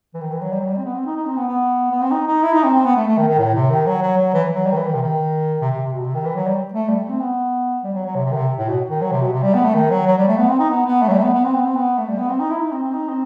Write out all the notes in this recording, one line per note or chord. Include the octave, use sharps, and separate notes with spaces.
E3
D#3
E3
F#3
G3
F#3
G3
C4
B3
C4
D#4
D#4
C4
B3
B3
B3
C4
D#4
D#4
E4
D#4
C4
C4
B3
A3
A3
D#3
D#3
A2
C3
D#3
F#3
F#3
F#3
E3
F#3
G3
D#3
E3
D#3
C3
D#3
C3
C3
C3
B2
C3
D#3
E3
F#3
G3
A3
G3
A3
C4
B3
G3
F#3
F#3
C3
C3
D#3
C3
A2
B2
D#3
F#3
C3
B2
C3
G3
B3
A3
D#3
F#3
F#3
G3
A3
B3
C4
D#4
B3
B3
A3
F#3
G3
A3
B3
B3
C4
B3
C4
B3
A3
G3
B3
C4
D#4
E4
D#4
C4
C4
D#4
C4